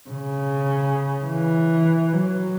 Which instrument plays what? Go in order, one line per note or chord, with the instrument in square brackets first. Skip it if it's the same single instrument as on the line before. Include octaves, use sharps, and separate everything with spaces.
[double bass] C#3
E3
F#3